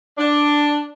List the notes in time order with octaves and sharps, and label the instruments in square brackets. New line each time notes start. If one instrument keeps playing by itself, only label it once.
[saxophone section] D4